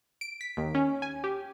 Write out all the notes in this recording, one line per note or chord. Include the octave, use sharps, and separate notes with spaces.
D7
B6
D#2
C#4
G#5
G4